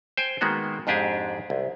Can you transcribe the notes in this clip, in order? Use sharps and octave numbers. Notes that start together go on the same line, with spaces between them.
C5 G5 G#5
D#3 G#3 A#3 B3 F#4
F2 G#2 D4 G4 G#4 G#5
C2